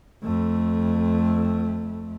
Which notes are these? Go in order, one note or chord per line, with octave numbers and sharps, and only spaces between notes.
F2 A3